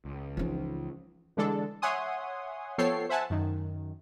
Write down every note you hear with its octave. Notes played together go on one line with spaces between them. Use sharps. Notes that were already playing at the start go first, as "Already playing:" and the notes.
C#2
E3 F3 C#4 D#4
D3 E3 G#3 D4 A4
C#5 E5 F#5 G#5 C6 D#6
F3 B3 A4 C#5 G5 C7
C5 E5 F#5 G#5 A5
F#2 D#3